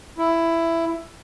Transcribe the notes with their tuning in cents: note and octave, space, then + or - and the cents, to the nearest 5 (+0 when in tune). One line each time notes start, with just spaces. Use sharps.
E4 +10